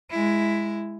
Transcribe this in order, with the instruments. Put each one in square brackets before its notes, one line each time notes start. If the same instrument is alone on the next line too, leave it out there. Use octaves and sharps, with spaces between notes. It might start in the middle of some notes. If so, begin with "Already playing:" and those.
[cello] G#3 E4